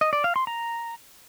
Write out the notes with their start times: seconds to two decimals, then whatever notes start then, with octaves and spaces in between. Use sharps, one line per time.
0.01 D#5
0.13 D5
0.24 F5
0.36 C6
0.47 A#5